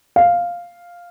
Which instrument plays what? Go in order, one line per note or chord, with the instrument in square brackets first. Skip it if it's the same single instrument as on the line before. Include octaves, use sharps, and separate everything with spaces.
[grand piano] F5